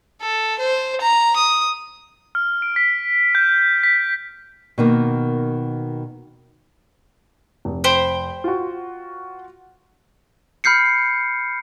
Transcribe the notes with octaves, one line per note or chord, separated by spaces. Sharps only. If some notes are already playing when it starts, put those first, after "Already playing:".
A4
C5
A#5
D#6
F6
D7
B6
G6
B6
B2 D#3 A#3
F1
C5 G5 B5
F4 F#4
B5 F6 G6 C7 C#7